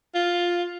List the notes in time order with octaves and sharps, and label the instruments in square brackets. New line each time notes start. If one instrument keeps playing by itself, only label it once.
[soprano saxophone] F4